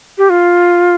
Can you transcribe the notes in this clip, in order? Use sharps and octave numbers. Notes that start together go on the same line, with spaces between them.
G4
F4